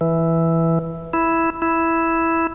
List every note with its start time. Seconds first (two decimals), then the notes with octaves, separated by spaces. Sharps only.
0.01 E3
1.13 E4
1.62 E4